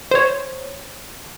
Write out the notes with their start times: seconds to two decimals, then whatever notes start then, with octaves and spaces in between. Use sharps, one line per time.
0.11 C5 C#5